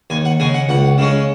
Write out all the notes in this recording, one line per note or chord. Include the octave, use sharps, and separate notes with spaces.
D#2 G#5
F#5
C#3 G#3 G#5
F#5
C#2 F#5
C#3 G#3 C#4